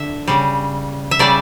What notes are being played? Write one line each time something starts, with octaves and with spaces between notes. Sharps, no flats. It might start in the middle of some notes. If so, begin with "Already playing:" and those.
Already playing: D3 E5
C#3 G3
E5
C#3 G3 D5